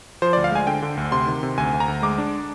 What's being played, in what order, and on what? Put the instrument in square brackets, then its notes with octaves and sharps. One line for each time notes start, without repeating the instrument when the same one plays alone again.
[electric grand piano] F3 C5
D2 D5
F5
G#3 G#5
D3 G5
D3
D2
C3 C6
D#3
C3
D2 G#5
D2
A#5
D2
G#3 D6
D4